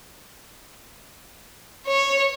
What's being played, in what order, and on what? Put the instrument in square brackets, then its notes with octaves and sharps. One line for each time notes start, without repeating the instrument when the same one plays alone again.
[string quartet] C#5